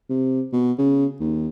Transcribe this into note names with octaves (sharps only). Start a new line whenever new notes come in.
C3
B2
C#3
D#2